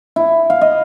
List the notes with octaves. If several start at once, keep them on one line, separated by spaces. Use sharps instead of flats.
E4
F5
D#5